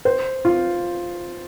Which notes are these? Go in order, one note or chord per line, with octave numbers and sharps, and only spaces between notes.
C5
F4